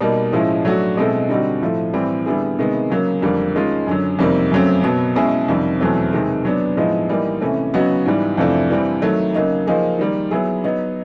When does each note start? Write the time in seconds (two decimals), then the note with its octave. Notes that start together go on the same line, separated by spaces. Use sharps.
0.01 B2 G3 A#3 D#4
0.33 A2 F3 G#3 C#4 E4
0.65 F#3 A3 D4 F#4
0.97 B2 G#3 C4 E4 A4
1.29 D3 G3 C4 D#4 F#4
1.61 A2 F3 A3
1.94 A2 E3 G3 C4
2.26 D3 G3 B3 E4 G#4
2.59 C3 D#3 G#3 B3
2.90 C#3 F#3 A#3
3.22 F2 D3 G3 A#3
3.55 D#3 G#3 C#4 F4
3.87 F#2 D3 F#3
4.19 F2 C3 D#3 G3 A#3
4.51 F#2 C#3 F#3 A3 C4
4.84 B2 F#3 B3
5.16 B2 G#3 C#4 E4 G#4
5.48 F2 C3 D#3 G3
5.80 E2 B2 F#3 A3 C4
6.13 C3 D#3 G#3 C4
6.45 F#3 B3 D4
6.77 A2 F3 G#3 B3 D#4
7.09 E3 G3 A#3 D#4
7.41 C3 E3 A3 C#4
7.74 C#3 F#3 B3 D#4 F#4
8.06 G#2 E3 G3
8.37 F2 C3 E3 A3 D4
8.70 E3 G3 C4
9.02 D#3 F#3 A3
9.34 C#3 F#3 A#3 D#4
9.67 F3 A#3 D#4 G#4
9.99 D#3 G3 A#3
10.31 F#3 B3 E4 G#4
10.64 F#3 B3 D#4